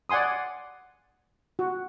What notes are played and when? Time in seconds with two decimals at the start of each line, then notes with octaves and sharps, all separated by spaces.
0.09 D5 F#5 G#5 C6 D#6
1.59 F#4